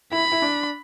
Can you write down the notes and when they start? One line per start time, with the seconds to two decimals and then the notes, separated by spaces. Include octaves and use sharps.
0.12 E4 B5
0.32 E4
0.42 D4